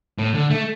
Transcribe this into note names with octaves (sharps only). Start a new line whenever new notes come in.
A2
D3
A3